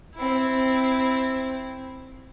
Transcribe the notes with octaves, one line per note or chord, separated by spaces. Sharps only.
C4 E4